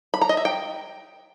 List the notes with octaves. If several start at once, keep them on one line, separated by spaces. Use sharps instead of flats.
B5
A#5
D#5
E5
G5